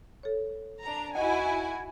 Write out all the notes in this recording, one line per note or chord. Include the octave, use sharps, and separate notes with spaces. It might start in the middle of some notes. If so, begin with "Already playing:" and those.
A4 C#5
D4 A#5
D#2 E4 F#4 D#5 F#5 G#5